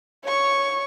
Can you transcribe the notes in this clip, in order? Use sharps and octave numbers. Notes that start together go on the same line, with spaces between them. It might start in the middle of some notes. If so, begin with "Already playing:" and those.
C#5 C#6